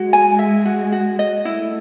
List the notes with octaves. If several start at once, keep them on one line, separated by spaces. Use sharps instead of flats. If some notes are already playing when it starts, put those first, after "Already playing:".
Already playing: G#3 F#4
G#5
E5
F#4
F#4
D#5
A3 E4